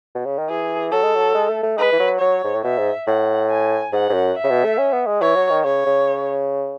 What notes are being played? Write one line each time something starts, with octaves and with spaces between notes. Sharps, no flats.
B2
C#3
D#3
E3 G#4
F#3 A4
G#3
F#3
G#3
A3
A3
G#3 B4
E3
F#3
F#3 C#5
G#2
A2
B2 E5
G#2
A2 F#5
G#5
G#2 F#5
G#2
F#2
E5
C#3
B2
A3
C#4
B3
G#3
E3 C#5
F#3
D#3
C#3 C#5
C#3